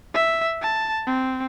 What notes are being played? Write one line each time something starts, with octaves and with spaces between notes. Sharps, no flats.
E5
A5
C4